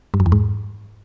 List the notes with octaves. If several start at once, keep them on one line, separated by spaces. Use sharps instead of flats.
G2
F#2
E2
G#2